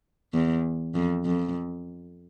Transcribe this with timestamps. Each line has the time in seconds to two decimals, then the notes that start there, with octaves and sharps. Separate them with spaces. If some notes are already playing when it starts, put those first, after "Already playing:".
0.34 E2
0.95 F2
1.25 F2